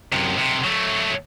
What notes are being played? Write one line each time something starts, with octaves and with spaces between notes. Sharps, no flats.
F#2 C3
B1 C3
F#3 A3